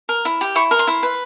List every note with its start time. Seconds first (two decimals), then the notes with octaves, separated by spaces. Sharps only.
0.09 A#4
0.25 E4
0.41 G4
0.55 E4 C#6
0.71 A#4
0.79 C6
0.87 E4
1.03 B4